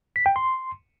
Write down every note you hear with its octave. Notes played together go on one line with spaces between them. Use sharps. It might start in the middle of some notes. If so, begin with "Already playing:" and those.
B6
G5
C6